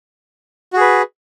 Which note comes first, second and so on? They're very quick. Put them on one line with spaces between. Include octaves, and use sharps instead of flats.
F#4 G#4 B4